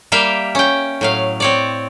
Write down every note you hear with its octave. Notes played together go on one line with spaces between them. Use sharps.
G3 A#3 E5 F5 G5
C#4 G5
A2 F#3 F5
C4 C#5 D5